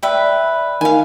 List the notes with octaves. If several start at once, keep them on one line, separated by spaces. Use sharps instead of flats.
B4 D5 E5 G5 B5
D#3 F5 G#5